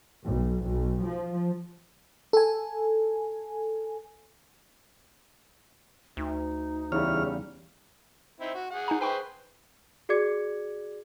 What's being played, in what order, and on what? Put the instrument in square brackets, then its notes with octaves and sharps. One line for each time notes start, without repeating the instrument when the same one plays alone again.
[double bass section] B1
B1
F3
[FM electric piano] A4 G#5
[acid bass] D2 [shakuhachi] D#4
[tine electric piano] E2 C#3 G3 [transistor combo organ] E3 C#5 F6
[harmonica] C4 D#4 E4
F#4
G#4 F#5
[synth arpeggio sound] D#4 G#5 A#5
[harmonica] G#4 B4 C5 [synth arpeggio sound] E5 G5 C#6
[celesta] F#4 G#4 D5 D6 G#6 C#7